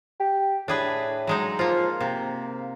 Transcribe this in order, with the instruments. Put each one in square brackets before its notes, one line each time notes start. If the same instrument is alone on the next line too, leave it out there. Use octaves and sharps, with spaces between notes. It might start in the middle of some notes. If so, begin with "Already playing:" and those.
[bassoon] G4
[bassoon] A2 [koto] D4 G#4 B4
[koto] F#3 G#3 D#4
[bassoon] F3 [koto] A#3 F4
[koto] C3 [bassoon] A#3